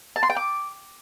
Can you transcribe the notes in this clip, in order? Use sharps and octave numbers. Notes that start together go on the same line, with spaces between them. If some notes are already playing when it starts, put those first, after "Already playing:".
A5
C6
G5
D6